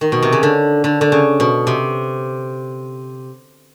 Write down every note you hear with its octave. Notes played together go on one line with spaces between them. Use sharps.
D#3
B2
C3
C#3
D3
D3
D3
C#3
B2
C3